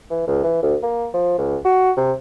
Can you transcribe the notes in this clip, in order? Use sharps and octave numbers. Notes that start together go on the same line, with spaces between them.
E3
C#2
E3
D2
A#3
F3
C#2
F#4
C3